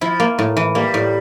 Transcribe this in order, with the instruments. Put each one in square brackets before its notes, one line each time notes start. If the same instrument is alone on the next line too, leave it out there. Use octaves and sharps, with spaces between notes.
[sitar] F3 [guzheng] E4
[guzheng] A#3
A2
E3
[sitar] G3 [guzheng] A#3
[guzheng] A2